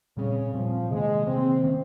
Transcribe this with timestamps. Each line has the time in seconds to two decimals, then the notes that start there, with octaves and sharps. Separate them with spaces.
0.17 A#2 C#3 G3 C4
0.53 A#2 F3 G3 C4
0.90 C3 D#3 G#3 A#3
1.27 C3 D#3 A#3 C4
1.64 D#3 A#3 C#4